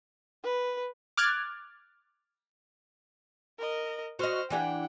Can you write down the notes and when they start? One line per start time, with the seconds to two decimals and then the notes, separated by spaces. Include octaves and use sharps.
0.44 B4
1.17 D6 F6 F#6 G#6 A6
3.59 A#4 D#5
4.19 F#4 C5 D#5 F6
4.50 E3 D4 G4 F#5 G5